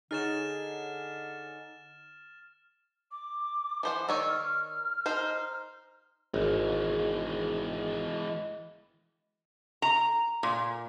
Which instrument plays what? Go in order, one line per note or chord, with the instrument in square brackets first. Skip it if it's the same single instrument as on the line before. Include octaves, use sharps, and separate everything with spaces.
[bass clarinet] D3 [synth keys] D#4 G#4 C#5 [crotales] F6 A6 E7
[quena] D6
[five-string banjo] E3 C5 F#5
[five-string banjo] D#3 C#5 D5 [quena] E6
[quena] F6
[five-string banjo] D#4 C5
[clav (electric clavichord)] G#1 [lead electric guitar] E3 G#3
[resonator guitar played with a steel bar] A#5
A#2